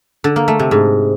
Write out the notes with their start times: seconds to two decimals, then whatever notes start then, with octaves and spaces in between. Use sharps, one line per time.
0.24 D3
0.36 A#3
0.48 A3
0.59 C3
0.71 G#2